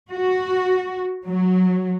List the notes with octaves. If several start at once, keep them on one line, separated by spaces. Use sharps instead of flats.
F#4
F#3